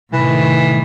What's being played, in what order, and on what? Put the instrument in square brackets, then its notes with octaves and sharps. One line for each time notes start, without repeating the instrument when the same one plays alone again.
[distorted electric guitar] C2 [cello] A2 D#3 [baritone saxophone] E3